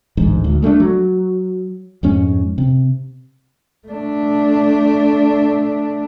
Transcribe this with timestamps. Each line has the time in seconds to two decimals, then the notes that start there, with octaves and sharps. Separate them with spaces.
0.17 D1 A1 G#2
0.44 D2
0.62 G#3 A3 C4 D4
0.80 F#3
2.03 F2 G#2 C#4
2.58 C3
3.88 A3 D4